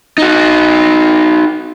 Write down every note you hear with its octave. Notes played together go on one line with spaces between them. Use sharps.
D#4 F#4